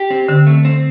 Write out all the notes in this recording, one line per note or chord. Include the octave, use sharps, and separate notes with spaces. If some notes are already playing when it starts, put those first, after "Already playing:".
Already playing: G4
C4
D3 C4
A3
C4